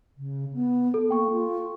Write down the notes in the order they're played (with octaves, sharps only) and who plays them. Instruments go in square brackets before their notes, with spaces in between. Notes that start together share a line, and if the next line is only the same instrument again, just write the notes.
[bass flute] C#3
B3
[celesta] A4
[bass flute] A#3 [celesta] A4 G5 C#6
[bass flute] F4